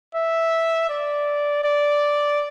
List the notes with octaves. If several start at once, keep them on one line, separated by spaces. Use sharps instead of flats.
E5
D5
D5